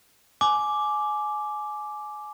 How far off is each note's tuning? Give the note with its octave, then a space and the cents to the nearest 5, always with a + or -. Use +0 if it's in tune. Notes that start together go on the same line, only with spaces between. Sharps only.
G#5 +25 D6 +0